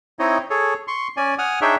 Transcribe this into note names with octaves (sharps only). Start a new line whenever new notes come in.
C4 D#4 E4 C#5 D#5
G#4 A4 C#5
C6 C#6
C#4 D5 G#5
F#5 G#5 D#6 F6
D4 D#4 G#4 C#5 E5 G5